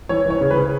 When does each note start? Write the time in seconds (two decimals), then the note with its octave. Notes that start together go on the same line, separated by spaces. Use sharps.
0.09 E3 C#5
0.26 E3 C#5
0.41 C#3
0.51 B4
0.56 C#3